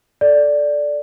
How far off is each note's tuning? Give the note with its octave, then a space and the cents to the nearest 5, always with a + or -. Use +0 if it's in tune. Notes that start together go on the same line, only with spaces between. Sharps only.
A4 +0 D5 +0